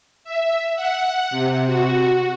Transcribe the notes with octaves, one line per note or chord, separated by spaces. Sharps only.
E5
F#5
C3
F#4